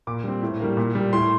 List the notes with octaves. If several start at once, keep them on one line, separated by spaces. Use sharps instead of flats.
A#2 D6
G3 C4
A2
G3 A#3
A#2
G3 A#3
A2 C6